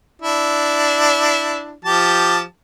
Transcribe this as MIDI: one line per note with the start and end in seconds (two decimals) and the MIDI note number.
0.22 1.73 62
0.22 1.73 64
1.85 2.41 53
1.85 2.41 67
1.85 2.41 81